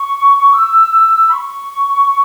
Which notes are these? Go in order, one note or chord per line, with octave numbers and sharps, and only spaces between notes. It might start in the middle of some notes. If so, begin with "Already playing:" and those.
Already playing: C#6
E6
B5
C#6